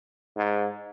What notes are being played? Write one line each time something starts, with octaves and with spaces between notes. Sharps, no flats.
G#2